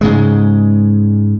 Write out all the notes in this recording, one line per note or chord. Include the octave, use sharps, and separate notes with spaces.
G#2 C#3 G#3